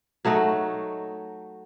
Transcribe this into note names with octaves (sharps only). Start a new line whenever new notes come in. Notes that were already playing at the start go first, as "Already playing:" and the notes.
F#3 A3 D#4 F#4